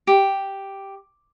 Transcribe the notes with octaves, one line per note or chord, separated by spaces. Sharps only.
G4